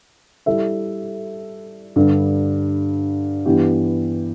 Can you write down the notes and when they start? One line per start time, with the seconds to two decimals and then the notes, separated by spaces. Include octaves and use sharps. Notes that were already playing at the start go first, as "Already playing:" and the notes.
0.46 G3 E4 A4 E5
1.96 G2 D3 G3
3.46 G2 E3 B3 G4